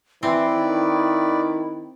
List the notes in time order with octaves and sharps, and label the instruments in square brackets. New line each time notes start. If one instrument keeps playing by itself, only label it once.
[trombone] E3 [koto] C4 [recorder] E4 [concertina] B4 D5
[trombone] D#3